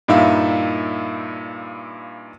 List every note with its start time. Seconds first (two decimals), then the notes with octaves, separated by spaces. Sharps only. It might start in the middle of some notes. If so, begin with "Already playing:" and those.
0.08 G2 A#2 D#4 E4 E5 F5